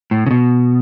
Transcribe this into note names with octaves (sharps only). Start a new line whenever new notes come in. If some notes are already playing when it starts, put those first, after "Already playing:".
A2
C#3
B2